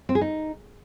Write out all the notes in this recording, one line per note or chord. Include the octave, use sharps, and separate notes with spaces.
C4
G#4
D#4